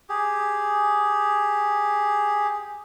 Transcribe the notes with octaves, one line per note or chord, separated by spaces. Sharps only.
G4 G#4